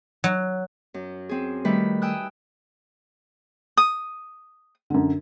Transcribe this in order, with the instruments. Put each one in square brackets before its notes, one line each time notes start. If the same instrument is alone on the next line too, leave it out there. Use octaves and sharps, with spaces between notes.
[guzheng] F#3
[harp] F#2
C4 G#4
D#3 G3 A3 B4 B5
G5 G#5 D#6 E6 F#6
[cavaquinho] D#6
[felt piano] F#2 D3